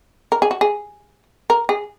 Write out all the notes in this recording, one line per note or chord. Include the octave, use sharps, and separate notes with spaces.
A#4
G#4
F#4
G#4
A#4
G#4